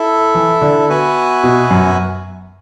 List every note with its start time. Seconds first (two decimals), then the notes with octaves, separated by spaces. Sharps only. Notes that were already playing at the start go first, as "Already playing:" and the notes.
Already playing: E4 A4 E5
0.35 E3
0.62 D3
0.89 B3 F#4 B4 E5 G#5
1.43 B2
1.70 F#2